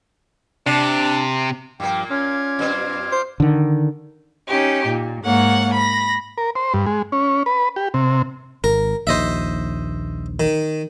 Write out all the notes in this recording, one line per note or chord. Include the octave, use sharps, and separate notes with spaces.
C3 D4
G2 A#2 F3 A#3 D4 G5
C#4 F4 D5 C6 G#6
F#2 C4
C5
D3 D#3
C#4 D#4 G4
A#2
G#2 A#3 C#5 F#5
B5 A#6
A#4
C5
G2
G#3
C#4
B4
G4
C3
G#1 A#4
A#1 D#2 C5 D#5 E5
D#3